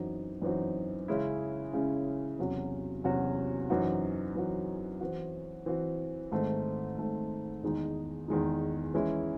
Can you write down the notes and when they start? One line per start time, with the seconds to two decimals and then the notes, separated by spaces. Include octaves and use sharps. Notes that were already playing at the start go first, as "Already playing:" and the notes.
Already playing: F#2 E3 C4 D#4 F#4
0.42 F#2 E3 C4 D#4 F#4
1.08 C#3 G#3 C#4 E4
1.73 C#3 G#3 C#4 E4
2.39 E2 C3 F#3 C#4 F#4
3.04 E2 C3 F#3 C#4 F#4
3.70 F#2 E3 C4 D#4 F#4
4.35 F#2 E3 C4 D#4 F#4
5.01 E3 C4 F#4
5.66 E3 C4 F#4
6.32 G#2 D#3 A3 C4
6.98 G#2 D#3 A3 C4
7.63 E2 D#3 G#3 D#4
8.28 E2 D#3 G#3 D#4
8.94 E3 G#3 C#4 E4